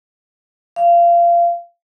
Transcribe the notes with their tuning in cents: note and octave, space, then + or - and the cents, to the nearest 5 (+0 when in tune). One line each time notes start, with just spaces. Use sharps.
F5 -25